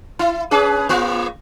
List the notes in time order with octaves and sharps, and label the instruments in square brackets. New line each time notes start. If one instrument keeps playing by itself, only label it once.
[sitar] E4
C#4 G#4 B4
A#3 F4